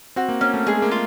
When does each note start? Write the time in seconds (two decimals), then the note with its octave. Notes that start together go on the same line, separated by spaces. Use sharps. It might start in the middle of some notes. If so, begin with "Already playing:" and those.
0.16 C4 F#4
0.29 A#3
0.41 A#3 C#4
0.54 A3
0.67 G#3 G#4
0.82 A#3
0.91 F4